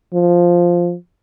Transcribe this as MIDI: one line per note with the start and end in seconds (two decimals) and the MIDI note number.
0.14 0.95 53